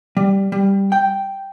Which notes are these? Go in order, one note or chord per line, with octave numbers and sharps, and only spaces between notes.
G3
G3
G5